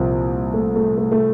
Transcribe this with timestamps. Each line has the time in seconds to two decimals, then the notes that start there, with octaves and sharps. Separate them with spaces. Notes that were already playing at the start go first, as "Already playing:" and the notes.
Already playing: C2 A#2 F3 A#3 C4
0.54 A3
0.76 A3
0.98 A3
1.12 A3